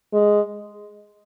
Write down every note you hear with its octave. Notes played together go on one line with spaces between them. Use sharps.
G#3